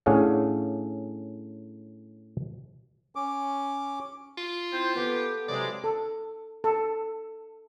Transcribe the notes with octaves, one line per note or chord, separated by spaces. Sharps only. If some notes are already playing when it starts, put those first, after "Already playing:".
A2 C#4 D4 G#4 F5 F#5
C#4 D6
F4
C4 E4 C5
B3 G4 A4 B4 F#5
C3 F#3 G#3 E4 D5
A4
A4